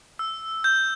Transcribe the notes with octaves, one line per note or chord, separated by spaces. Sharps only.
E6
G6